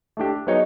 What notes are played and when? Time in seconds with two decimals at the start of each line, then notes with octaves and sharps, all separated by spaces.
0.17 A3 D4 G4
0.47 F#3 B3 D#4 G#4 C#5